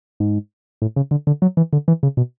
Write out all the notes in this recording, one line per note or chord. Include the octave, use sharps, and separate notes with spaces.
G#2
A2
C#3
D3
D3
F#3
E3
D3
E3
C#3
B2